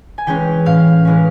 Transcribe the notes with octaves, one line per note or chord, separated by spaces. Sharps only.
G#5
E3 G#3 C#4 G5
A2 F5
E3 G#3 C#4